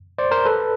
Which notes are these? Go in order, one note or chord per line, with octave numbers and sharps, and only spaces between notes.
C5 D5
A#4 C5
A4 B4